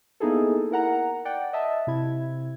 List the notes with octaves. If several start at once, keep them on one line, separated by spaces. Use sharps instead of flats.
A#3 B3 D#4 E4 G#4 A4
E4 A#4 F#5 A#5
D5 F#5 G5
D#5 E5 A5
C3 E4 G#6